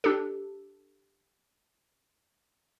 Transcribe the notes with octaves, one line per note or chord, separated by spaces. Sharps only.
D4 G4 A4